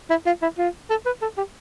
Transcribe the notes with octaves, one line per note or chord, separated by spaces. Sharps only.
E4
F4
E4
F4
A4
B4
A4
G4